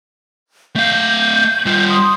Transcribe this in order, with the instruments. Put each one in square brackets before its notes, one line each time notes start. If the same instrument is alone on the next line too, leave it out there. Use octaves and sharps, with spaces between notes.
[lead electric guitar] A3 F5 [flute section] G6
[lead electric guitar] G3 F4
[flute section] C6 D#6